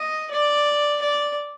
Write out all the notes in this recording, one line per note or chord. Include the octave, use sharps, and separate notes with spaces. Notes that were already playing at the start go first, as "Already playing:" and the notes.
Already playing: D#5
D5
D5